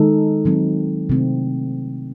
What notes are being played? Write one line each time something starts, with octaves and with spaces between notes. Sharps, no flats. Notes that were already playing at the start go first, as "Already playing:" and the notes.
Already playing: D#3 G#3 D#4 A4
D#3 F#3 C4
C3 D#3 A3 C4 E4